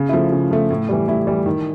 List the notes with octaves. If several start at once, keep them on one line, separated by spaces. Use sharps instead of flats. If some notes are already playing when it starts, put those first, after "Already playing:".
Already playing: C#3
F3 A3 E4
C#3
F3 A3
A2
E3 G3
A2 E4
E3 G3
D#3